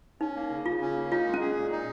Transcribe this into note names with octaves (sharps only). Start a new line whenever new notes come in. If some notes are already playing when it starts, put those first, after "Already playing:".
C#4 D#4
A#3
C#3
C#3 F4
C#4
A#3
D#4 F4
G#3
C#4
G#4
A#2
D#4